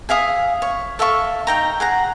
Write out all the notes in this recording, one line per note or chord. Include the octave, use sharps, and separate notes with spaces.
G#4 E5 F5 D#6
C#5
A4 E5 F5 C#6
D#4 G5 A#5
G#4 F#5 A#5